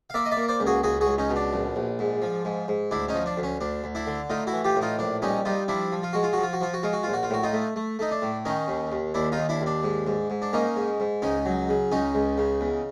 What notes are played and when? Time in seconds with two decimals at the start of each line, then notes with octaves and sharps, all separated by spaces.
0.10 F5
0.14 A#3 D5 E5
0.25 D#5
0.31 D5 E5
0.37 A#3
0.48 C5 D5
0.60 C#2
0.67 F#4 G#4
0.83 C#2 F#4 G#4
1.01 F#4 G#4
1.07 C#2
1.18 C#4 D#4
1.30 B2
1.36 D4
1.53 A#1
1.76 A#1
1.99 G#2
2.22 F3
2.45 G#2
2.68 G#2
2.91 D2 D4 E4
3.08 C#4 D#4
3.14 F3
3.26 D4
3.37 D2
3.43 C#4
3.61 D2 D4
3.84 D2
3.95 D4 E4
4.07 D3
4.30 A2 D#4 F4
4.47 E4 F#4
4.53 E3
4.64 F4 G4
4.76 A2
4.82 D#4 F4
4.99 A#1 D4
5.22 G3 C#4 D#4
5.45 G3 D#4 F4
5.68 F3 D4 E4
5.92 F3
6.03 F4
6.13 G#3 F#4
6.23 F4
6.33 F3 F#4
6.43 F4
6.53 F#4
6.61 F3 F4
6.74 F#4
6.83 G#3 F4
6.93 F#4
7.03 A#1 F4
7.13 F#4
7.23 F4
7.30 A2 F#4
7.43 D#4 F4
7.53 A3
7.76 A3
7.99 A3 D#4
8.11 D4
8.22 A2
8.45 D#3 C#4 D#4
8.68 D#2
8.92 D#2
9.14 D#2 D4 E4
9.32 D#4 F4
9.37 D#2
9.49 D4 E4
9.61 D#2
9.66 D4
9.84 G#2
10.07 G#2
10.30 G#2
10.42 D4
10.53 A#3 C#4 D#4
10.76 G#2
11.00 G#2
11.22 C#2 C#4 D#4
11.45 F#3
11.69 C#3
11.92 C#2 C#4 D#4
12.15 C#2
12.38 C#3
12.61 E2